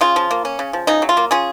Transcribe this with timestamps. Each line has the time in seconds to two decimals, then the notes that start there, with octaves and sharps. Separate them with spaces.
0.01 C#3 F4
0.16 F3
0.31 A#3
0.45 C#4
0.59 C#3
0.73 F3
0.87 C#3 D#4
1.02 F#3
1.09 F4
1.17 A#3
1.31 C#4 F4 G#4